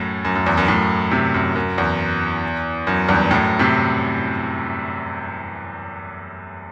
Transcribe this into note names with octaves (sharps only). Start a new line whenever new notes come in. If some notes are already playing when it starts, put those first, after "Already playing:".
Already playing: F#2 A2
F#2
F#2
E2
F#2
F#2 A2
A2 C3
F#2
F#2
E2
F#2
E2 G2
F#2 A2
A2 C3